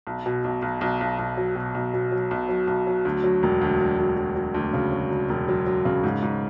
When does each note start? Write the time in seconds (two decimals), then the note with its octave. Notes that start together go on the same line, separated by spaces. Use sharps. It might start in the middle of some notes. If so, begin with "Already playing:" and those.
0.07 B1
0.26 B2
0.44 B1
0.62 B1
0.81 B1
1.01 B1
1.19 B1
1.37 F#3
1.55 B2
1.75 B1
1.94 B2
2.12 F#3
2.31 B1
2.49 F#3
2.67 B1
2.87 F#3
3.05 D2
3.24 F#3
3.43 E1
3.62 D2
3.80 F#3
3.98 D2
4.17 F#3
4.35 F#3
4.54 D2
4.73 C#3
4.92 F#3
5.11 E1
5.29 E1
5.48 F#3
5.66 F#3
5.85 C#3
6.04 G#2
6.22 G#2